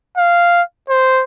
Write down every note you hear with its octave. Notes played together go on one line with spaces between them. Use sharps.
F5
C5